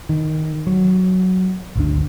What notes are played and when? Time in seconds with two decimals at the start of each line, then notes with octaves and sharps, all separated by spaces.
0.09 D#3
0.67 F#3
1.76 G#1 D2 D4